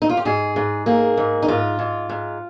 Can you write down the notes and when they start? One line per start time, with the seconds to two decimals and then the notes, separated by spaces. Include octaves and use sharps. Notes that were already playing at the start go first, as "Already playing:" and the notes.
0.02 D#4
0.10 F4
0.17 G4
0.25 G#2 G#4
0.56 G#2
0.86 A#3 G#4
1.17 G#2
1.42 D#4
1.48 G#2 F4
1.79 G#2
2.09 G#2